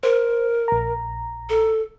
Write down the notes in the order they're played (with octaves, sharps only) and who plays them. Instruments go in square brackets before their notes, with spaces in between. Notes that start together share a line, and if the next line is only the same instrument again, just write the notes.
[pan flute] A#4 [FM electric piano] C5
[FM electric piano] A#1 A#5
[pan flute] A4